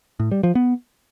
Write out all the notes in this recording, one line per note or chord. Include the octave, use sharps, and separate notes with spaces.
A2
G3
F3
B3